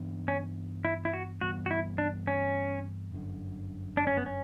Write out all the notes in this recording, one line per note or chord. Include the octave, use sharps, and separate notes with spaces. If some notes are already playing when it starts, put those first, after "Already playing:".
Already playing: G2 E3 B3 D4
C#4
E4
E4
F#4
G2 E3 G3 B3 F#4
F#4
E4
D4
C#4
G1 F#2 D3
D4
C#4
B3
C#4